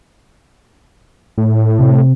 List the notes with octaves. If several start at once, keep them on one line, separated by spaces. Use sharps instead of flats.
A2
C3